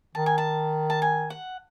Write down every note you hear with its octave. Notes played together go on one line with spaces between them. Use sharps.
D#3 A5
G#5
A5
A5
G#5
F#5